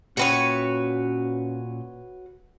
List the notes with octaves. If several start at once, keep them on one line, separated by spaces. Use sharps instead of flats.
A#2 C#4 F#4 B4 C#5 G5